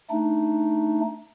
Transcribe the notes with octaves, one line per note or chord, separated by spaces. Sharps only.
A3 D4 D#4